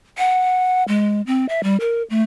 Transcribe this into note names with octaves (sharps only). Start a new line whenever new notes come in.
F#5
G#3
C4
E5
G3
A#4
A3